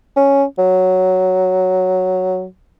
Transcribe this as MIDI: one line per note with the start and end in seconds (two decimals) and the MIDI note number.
0.17 0.44 61
0.58 2.45 54